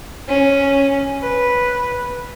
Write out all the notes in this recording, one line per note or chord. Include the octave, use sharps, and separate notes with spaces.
C#4
B4